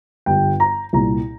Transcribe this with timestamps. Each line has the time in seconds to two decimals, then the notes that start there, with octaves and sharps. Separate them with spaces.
0.26 G1 G2 G3 G5
0.60 A#5
0.93 C2 A#2 G3 A#5